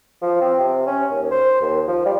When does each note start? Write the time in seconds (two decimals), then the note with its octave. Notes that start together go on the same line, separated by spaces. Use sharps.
0.22 F3
0.41 C4
0.60 C3
0.86 C#4
1.10 D#2
1.31 C5
1.61 D#2
1.87 F3
2.06 G3